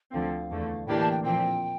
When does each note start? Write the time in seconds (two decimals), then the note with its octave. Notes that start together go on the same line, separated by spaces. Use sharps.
0.11 D2 D3 F3 C4 F5
0.50 E2 D3 A3
0.86 A2 E3 A#3 D4 G4 G5
1.00 A5
1.11 G5
1.24 A#2 F3 C4 G5